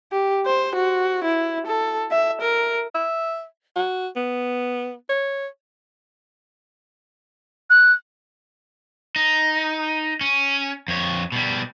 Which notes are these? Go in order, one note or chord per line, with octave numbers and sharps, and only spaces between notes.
G4
C5
F#4
E4
A4
E5
A#4
E5
F#4
B3
C#5
F#6
D#4
C#4
F2 C#5
B2 G3